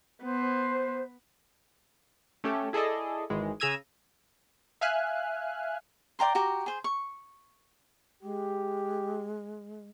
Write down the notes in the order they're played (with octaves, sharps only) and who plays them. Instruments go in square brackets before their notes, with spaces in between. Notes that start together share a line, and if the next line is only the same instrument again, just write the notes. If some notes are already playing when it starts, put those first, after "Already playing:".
[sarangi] B3 [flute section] C5
[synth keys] A3 C#4 G4 A4
E4 G#4 A4 D5 D#5
G#1 D#3 E3 G#3
C#3 G#4 A#5 E6 G#6 D#7
[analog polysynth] E5 F5 G#5 F6 F#6
[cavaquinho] D5 G5 A#5 C6
F#4 G4 A#5
G#4 C5
C#6
[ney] G#3 [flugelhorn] G4